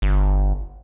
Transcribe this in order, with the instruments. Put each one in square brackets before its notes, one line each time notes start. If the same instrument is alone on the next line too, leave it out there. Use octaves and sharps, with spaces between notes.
[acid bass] G1